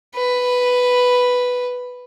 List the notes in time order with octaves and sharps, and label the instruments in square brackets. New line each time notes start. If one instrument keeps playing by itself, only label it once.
[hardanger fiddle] B4